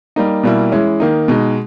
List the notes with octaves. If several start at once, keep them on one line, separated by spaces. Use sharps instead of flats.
G3 A#3 D#4
B2 G3 A#3 E4
E3 G#3 C#4 E4
D#3 A#3 D#4
B2 G#3 D#4